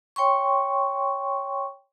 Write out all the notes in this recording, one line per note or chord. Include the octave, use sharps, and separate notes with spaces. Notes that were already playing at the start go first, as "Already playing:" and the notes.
C#5 G5 C6 C#6